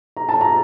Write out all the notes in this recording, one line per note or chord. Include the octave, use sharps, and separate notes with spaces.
A#5
A5
A#5